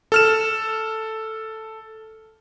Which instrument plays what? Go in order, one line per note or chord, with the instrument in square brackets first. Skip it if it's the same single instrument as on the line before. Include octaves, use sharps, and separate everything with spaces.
[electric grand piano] A4 F6 E7